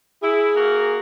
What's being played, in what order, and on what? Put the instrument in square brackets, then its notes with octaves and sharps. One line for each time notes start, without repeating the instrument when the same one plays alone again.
[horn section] E4 [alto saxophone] G#4
[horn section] A#3 F#4 A#4